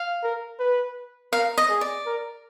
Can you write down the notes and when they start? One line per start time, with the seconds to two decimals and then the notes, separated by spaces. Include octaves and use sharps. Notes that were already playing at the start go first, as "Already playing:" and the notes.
Already playing: F5
0.23 A#4
0.59 B4
1.33 A#4 F5
1.58 D#5
1.69 G#4
1.81 D5
2.06 A#4